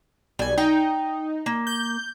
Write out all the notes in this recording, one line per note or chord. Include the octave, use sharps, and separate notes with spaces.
B1 G3 G#5
D#4 G5
A#3
G6